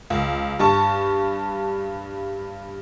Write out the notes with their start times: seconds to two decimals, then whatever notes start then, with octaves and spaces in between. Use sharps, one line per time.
0.10 C#2
0.59 G2 A5 C#6